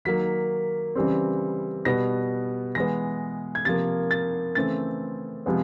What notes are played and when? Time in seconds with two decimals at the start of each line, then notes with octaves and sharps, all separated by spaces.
0.05 D#3 F#3 A#3 B6
0.95 C#3 E3 G3 C4
1.85 B2 G3 B3 A#6
2.75 E3 G#3 B3 A#6
3.55 G#6
3.65 C3 F3 A#3 A6
4.11 A6
4.55 C#3 E3 A3 C4 A6
5.46 C3 F3 G#3 B3